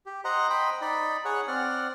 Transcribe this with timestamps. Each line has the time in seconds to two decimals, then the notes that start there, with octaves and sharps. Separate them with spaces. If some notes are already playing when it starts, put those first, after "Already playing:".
0.06 G4
0.25 C5 D#5 F#5 A#5
0.50 C5 D#5 G5 B5
0.81 D#4 D5 B5
1.25 G#4 C#5 F#5
1.48 C4 D5 F#5 F6